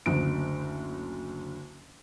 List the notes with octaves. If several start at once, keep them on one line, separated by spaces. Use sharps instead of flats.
F#1 D2 D7